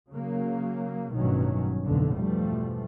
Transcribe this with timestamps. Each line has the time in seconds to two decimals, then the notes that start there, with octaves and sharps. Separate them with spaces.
0.12 C#3 F#3 A#3
1.12 A1 G2 B2 D#3 F#3 C#4
1.84 F1 B1 F2 A2 D3
2.15 E2 G2 B2 F3 G3 A3